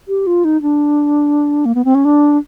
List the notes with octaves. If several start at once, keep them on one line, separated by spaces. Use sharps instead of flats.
G4
F4
D#4
D4
A#3
B3
C4
C#4
D4